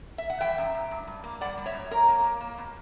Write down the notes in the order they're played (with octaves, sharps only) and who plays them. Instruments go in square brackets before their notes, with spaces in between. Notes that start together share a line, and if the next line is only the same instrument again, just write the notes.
[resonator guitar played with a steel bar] E5
F#5
E3 E5 G5
F#2
F#2
G2
G2
A#3
G3 D5 F#5
G3
C#5 E5
F#2
A#3 A#4 C#5
A#3
A#3
A#3
B2